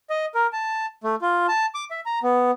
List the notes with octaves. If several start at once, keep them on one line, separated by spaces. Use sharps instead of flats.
D#5
A#4
A5
A3
F4
A5
D6
E5
A#5
B3